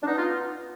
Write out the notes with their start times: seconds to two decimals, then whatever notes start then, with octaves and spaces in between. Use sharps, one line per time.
0.03 D4
0.07 B3 D#4
0.17 F4